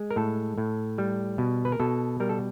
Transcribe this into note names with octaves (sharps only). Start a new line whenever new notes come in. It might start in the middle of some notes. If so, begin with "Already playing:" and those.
Already playing: G#3
A#4
A2 A4
A2
G3
B2
B4
A#4
B2 A4
G3 A#4
A4